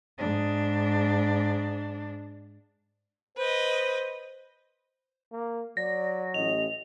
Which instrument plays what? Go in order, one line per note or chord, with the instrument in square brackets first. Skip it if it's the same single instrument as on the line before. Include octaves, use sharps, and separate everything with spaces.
[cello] G#2 D4
[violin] B4 D#5 [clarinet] C5
[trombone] A#3
[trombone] F#3 [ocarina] D5 [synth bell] A#6
[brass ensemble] A1 [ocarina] D#5 [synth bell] F7